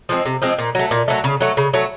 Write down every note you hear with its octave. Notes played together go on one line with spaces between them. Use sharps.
F3 G#3 C4
C3
F3 G#3 C4
A#2
F#3 A3
A#2
F#3 A3
C#3
F#3 A3
C#3
F#3 A3